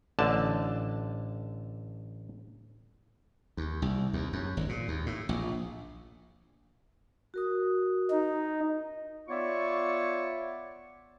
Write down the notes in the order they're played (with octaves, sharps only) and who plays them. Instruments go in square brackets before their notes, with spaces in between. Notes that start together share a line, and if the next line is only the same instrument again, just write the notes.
[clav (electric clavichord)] A1 D3 A5
[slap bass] D#2
C2
D#2
F#2
G#1
A#2
D#2
A2
A#1
[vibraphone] F#4 A#4 D#6
[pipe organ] D#4
[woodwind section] B3 F4 C#5 D5 E5 C#6